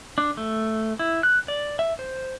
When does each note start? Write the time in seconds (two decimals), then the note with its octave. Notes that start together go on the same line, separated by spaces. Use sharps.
0.18 D4
0.37 A3
0.99 E4
1.23 F#6
1.48 D5
1.79 E5
1.99 C5